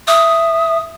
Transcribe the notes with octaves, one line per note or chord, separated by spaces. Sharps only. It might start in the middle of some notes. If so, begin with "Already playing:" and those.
E5 D#6